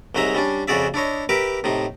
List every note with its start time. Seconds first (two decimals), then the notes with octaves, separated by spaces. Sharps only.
0.15 C2 F#3 G#3 D#4 E5 A#5
0.35 G3 C#4 D4
0.68 F2 C#3 F#4 G#4 D5 E5
0.94 D4 E4 C#5 D#5
1.29 G4 A#4 B4 E5 D6
1.64 A2 C3 D#4